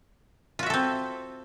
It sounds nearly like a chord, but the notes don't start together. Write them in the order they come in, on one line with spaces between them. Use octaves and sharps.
F4 F#4 E5 A4 C4